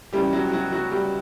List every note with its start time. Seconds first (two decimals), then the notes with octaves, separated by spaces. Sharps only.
0.13 C#2 C#3 E3 G3 G4
0.33 F#3 F#4
0.52 F#3 F#4
0.72 F#3 F#4
0.92 G3 G4